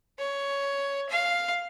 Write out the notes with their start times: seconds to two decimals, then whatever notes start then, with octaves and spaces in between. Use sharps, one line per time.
0.19 C#5
1.09 F5